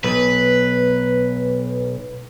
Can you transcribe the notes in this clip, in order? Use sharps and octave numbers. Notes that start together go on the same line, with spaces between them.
B1 B4